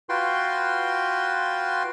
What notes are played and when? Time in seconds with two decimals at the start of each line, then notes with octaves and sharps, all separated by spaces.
0.09 F4 F#4 B4 G5 C6